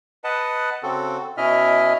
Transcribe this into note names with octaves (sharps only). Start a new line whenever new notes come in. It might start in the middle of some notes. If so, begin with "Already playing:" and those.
B4 D#5 F#5 A5
C#3 C4 F#4 A4
B2 C#4 E4 D#5 E5 F6